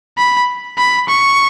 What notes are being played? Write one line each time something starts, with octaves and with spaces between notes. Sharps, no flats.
B5
B5
C#6